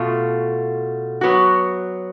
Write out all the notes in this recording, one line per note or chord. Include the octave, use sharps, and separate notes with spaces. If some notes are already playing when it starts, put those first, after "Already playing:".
Already playing: B2 A3 F4
F#3 B3 F#4